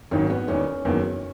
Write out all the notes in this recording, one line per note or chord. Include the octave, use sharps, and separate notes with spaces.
G#1 G#2 D#3 F#3 C#4
B3
E1 E2 D#3 C#4
F#1 E2 D#3 F#3